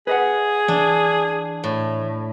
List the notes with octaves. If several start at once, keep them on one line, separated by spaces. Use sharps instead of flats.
G#4 B4 D#5 F#5
E3 D4
A2